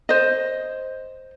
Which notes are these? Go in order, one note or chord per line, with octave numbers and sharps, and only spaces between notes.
C5 D#5